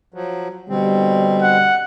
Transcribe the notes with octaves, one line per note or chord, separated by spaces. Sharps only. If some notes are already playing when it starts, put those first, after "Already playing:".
F3 F#3
B2 D3 G3 C4
F#5